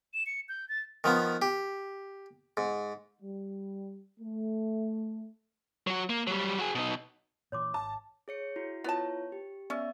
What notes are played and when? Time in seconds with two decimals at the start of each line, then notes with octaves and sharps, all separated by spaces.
0.14 E7
0.26 C#7
0.49 G6
0.69 A6
1.04 D#3 F3 B3
1.42 G4
2.57 G#2
3.22 G3
4.20 A3
5.87 F#3 F#4
6.10 A#3
6.27 F#3 G3
6.59 F#4 G#4
6.75 B2 D#4
7.52 A#2 E3 C#5 C6 D6
7.74 G#1 A5
8.28 G#4 C#5 C#7
8.56 E4 F#4
8.84 B3 E4 F4 C#5 A5
9.32 G4
9.70 B3 C#4 D5 E5